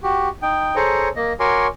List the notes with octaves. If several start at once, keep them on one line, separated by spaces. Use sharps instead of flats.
F#4 G4
D#4 G5
G#4 A4 C5 C#5 A#5
A#3 D#5
F#4 A#4 C#5 G#5 C6 D6